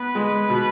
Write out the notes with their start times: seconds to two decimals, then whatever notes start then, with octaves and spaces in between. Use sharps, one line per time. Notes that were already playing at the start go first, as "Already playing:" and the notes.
Already playing: B3 B4
0.15 G#3
0.50 B2